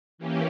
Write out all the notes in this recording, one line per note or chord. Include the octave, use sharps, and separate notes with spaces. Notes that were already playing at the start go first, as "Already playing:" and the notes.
E3 A#3 C#4 G4